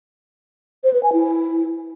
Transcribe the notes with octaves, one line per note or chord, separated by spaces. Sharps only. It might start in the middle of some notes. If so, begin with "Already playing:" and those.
C5
B4
G#5
E4